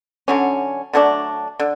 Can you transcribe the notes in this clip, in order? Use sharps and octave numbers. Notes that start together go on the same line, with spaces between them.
D3 F#3 C#4
D3 F#3 A3 D4
D3